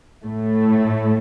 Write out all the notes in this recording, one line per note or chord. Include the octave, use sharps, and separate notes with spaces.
A2 A3